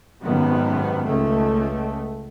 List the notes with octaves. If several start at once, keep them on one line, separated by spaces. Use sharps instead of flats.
G#1 F#2 C3 D#3 B3
C#2 A3